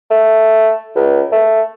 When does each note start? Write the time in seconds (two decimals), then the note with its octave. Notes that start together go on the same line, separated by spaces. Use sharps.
0.11 A3
0.96 C#2
1.32 A3